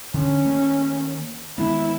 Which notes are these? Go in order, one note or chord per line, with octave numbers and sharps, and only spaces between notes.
D3 C#4
D#3 A3 A#3
D#3 G#3 B3 E4